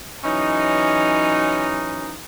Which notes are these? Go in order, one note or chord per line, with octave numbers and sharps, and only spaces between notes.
E3 F#3 C#4 D#4